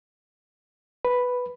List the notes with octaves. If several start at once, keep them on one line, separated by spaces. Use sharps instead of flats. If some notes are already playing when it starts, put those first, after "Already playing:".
B4